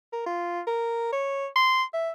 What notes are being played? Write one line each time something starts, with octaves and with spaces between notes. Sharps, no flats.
A#4
F4
A#4
C#5
C6
E5